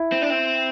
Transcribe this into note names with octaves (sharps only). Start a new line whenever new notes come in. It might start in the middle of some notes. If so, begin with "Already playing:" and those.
Already playing: E4
C4
D4
C4